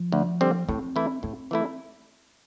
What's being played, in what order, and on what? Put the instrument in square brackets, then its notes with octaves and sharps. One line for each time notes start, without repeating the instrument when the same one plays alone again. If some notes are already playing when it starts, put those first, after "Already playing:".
Already playing: [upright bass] F3
[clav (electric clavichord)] D2
D3 G3 C4
[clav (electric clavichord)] A2 [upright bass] C4
[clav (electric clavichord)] E3 A3 E4
[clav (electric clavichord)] A2 [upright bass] C4
[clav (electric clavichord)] E3 A3 E4